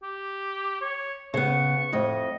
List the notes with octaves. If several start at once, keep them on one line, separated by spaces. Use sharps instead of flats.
G4
C#5
C#3 B3 C#6
F2 A2 D#5